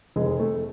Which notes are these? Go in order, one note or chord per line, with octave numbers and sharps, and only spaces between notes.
F1 G#3
A3